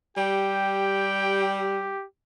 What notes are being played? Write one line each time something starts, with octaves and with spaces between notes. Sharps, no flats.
G3 G4 G5